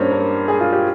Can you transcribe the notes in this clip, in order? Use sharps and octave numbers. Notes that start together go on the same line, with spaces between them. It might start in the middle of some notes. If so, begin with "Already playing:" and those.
Already playing: G2 G3 A#3 C#4 C5 C#5
A#4
G#4
F4
G4